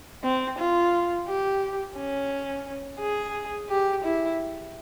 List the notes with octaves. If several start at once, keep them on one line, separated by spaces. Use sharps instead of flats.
C4
F4
G4
C#4
G#4
G4
E4